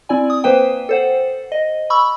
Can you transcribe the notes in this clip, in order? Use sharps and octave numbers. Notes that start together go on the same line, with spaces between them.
C4 E4 D5 G#5
D#6
A#3 B4 C5 G5
A4 C5 F#5
D#5
B5 C#6 E6